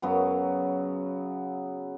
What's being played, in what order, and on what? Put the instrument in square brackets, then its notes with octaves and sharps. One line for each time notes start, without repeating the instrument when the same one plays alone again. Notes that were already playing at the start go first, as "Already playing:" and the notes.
[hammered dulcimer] F#2 C#3 F#3 B3